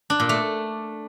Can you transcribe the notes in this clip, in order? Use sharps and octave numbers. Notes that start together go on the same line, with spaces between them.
D4
A#2
A3